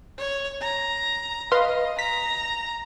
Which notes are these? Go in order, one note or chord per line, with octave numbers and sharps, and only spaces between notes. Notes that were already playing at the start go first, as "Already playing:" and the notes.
C#5
A#5
B4 D#5 F5 C6
A#5 B6